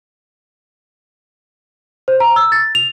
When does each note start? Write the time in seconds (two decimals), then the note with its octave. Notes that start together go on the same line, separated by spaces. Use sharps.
2.08 C5
2.20 A#5
2.36 E6
2.52 A6
2.75 F7